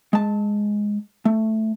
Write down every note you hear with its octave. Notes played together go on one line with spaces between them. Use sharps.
G#3 A5
A3